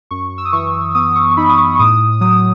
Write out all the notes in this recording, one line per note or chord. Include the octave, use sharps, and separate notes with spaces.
F#2 C#6
E6
D#6
E3 C#6
B3 D#6
C#6
C#6
D#4 B5
D#6
C#6
C#6
A2 D#6
F#3 D#6